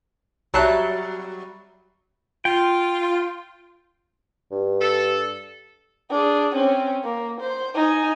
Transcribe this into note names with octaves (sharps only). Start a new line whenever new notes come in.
B1 F#3 G3 E5 A5 A#5 F#6
F4 G5
G2
A4
D4 G#4
C4 C#4
A#3
C5
D#4 G#5